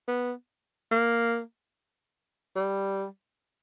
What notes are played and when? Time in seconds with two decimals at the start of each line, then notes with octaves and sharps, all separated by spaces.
0.08 B3
0.91 A#3
2.56 G3